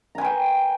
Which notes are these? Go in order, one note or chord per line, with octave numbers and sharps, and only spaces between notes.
B4 G5 G#5 A#5